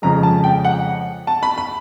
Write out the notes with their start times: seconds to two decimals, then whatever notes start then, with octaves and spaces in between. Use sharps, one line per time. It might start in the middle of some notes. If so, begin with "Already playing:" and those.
0.02 F2 C#3 F3 G#3 A#5
0.23 A5
0.44 G5
0.65 F#5
1.27 A5
1.43 B5
1.58 B5